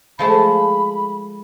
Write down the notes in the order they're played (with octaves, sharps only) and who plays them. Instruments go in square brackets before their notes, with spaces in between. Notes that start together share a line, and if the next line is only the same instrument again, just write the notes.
[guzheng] F3 G#3 A3 [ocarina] B5